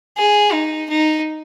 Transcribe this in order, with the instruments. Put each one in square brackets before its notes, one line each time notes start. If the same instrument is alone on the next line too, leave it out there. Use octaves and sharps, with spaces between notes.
[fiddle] G#4
D#4
D#4